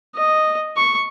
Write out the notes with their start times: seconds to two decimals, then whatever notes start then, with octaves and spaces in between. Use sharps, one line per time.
0.16 D#5
0.77 C#6